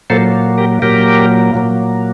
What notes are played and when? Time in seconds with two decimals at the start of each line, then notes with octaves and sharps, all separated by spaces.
0.10 A#2 F#3 A#3 A4 C5
0.58 G4 A#4
0.82 A#2 F#3 A#3 G4 A#4
1.54 A#2 F#3 A#3